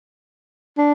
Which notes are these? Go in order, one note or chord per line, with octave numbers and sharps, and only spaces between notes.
D4